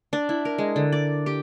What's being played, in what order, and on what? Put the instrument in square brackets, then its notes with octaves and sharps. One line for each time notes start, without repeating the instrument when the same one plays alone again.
[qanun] D4
E4
A#4
G#3
D3
D5
G4